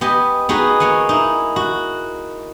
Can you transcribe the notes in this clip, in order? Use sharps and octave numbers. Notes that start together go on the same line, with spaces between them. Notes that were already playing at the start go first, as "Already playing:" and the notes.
B3 G4 D#5 G#5
B3 D#4 F#4 G#4
A#3 C#5 F#5 G#5
D#4 E4
F#4